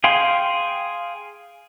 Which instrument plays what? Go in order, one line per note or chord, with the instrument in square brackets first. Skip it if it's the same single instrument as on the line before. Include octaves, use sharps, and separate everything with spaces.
[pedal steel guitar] G#4 F5 G5 C6